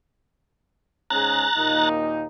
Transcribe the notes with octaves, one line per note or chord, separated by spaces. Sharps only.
G#2 C#4 G#4 A#5 F#6 A6
D#2 A#2 D#4